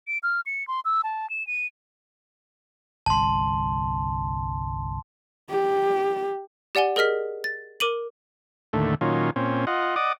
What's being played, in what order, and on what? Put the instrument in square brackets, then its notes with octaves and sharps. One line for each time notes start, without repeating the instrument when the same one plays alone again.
[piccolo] D7
F6
C#7
C6
E6
A5
E7
D#7
[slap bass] G1 C2 [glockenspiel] A5 C6
[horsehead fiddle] G4
[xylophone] G4 D5 F#5 G#5 G7
G#4 A#4 D#5 F6 B6
A6
A#4 D6 D#7 F#7
[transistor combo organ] D#2 A2 D3 A3
A#2 D#3 F#3 C#4 F4
A#2 C4 C#4
F4 D#5 F#5
D5 D#5 F#5 D6 D#6